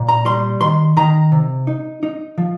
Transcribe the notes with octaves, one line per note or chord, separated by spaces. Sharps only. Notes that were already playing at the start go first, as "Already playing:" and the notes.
Already playing: A#2
A#5
G3 C6
D#3 C6
D#3 A#5
C3
D#4
D#4
F3